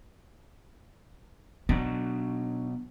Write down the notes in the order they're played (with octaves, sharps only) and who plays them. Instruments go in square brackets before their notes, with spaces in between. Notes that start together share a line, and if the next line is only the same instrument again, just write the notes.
[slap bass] B2 F#3 [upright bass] D4